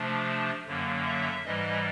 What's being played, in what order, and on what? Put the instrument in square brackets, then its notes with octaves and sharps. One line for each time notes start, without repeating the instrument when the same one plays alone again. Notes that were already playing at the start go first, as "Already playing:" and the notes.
Already playing: [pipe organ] C3 F3 A3 D4
F#2 D3 F#3 A#3
E5
G#2 E3 G3 D#5